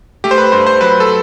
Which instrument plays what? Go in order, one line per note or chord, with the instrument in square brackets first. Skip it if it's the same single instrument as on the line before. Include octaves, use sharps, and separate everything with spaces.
[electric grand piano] A3 G4
C5
B4
G2 C5
C5
F#3 B4
A4